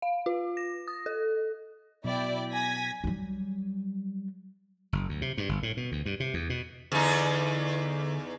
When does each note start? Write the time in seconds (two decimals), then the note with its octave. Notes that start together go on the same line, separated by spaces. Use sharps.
0.02 F5
0.26 F4
0.57 A#6
0.88 D#6
1.06 A4
2.04 B2 F#3 E4 D5 G5
2.52 G#5 G#6 A#6 B6
3.04 F#3 G3
4.93 F#1
5.09 D2
5.22 C3
5.38 G2
5.49 G1
5.63 A2
5.77 B2
5.92 D2
6.06 G2
6.20 C3
6.34 E2
6.50 B2
6.92 E2 D3 D#4